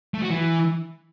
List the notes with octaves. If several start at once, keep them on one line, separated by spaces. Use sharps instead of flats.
A3
F#4
E3